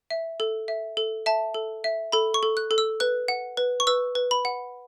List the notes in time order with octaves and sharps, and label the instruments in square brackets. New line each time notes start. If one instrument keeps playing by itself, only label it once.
[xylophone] E5
A4
E5
A4
E5 A5
A4
E5
A4 B5
C#6
A4
F#6
A4
E6
B4 F#6
F#5
B4
C#6
B4 E6
B4
B5
F#5